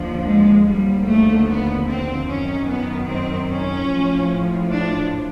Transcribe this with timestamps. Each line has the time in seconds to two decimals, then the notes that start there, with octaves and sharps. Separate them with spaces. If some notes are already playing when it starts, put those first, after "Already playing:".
Already playing: D#2 D3 F3
0.26 G#3
0.66 D#2 D3 F3 G3
1.07 A3
1.47 B3
1.87 C4
2.27 F#2 D#3 C#4
2.68 B3
3.08 C4
3.48 C#4
3.88 A2 F3
4.69 D4